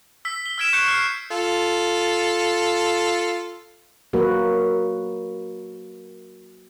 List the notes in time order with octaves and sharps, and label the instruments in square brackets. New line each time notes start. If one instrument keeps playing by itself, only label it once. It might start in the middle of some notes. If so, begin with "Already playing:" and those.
[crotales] E6 B6
G7
E6 F6 G#6 B6 D7 E7
C#6 F#6 G6 C7 C#7
F6 F#6 C7
[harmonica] F4 A4
[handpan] F#3 A#3 F#4 A#4 B4